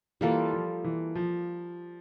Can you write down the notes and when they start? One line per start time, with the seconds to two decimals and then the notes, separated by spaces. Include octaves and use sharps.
0.21 E3 G3 A#3 F4 A4
0.53 F3
0.84 E3
1.15 F3